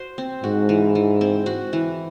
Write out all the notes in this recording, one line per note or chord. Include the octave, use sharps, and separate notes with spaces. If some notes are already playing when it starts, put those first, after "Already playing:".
Already playing: F#4 C5
C4
G#2 F#4
E3
E3
C4
F#4
E3